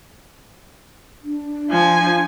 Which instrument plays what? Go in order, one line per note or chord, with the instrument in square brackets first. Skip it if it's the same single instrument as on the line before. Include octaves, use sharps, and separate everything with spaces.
[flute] D4
[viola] F3 G#5